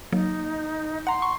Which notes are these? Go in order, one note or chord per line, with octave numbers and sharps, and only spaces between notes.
F#3 A#3 D#4
F#5 A#5 C6
C#6